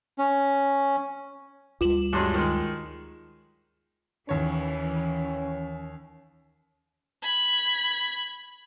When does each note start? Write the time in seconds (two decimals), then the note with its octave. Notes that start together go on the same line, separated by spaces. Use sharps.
0.18 C#4
1.81 D2 G3 F4 E7 F#7
2.13 G2 F#3 G#3
2.34 D#3 G#3
4.29 D#2 E3 C#4 C#5
7.22 B5 G#6